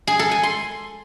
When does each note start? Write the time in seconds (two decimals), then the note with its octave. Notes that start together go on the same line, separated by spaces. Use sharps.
0.07 G#4
0.19 A4
0.31 G#5
0.43 C6